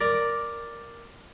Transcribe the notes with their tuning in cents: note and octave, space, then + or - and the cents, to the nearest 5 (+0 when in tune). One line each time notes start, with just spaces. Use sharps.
A#4 +0 D5 +0